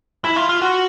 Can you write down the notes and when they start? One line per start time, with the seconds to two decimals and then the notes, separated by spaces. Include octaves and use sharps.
0.24 E4
0.36 F4
0.49 F4
0.62 F#4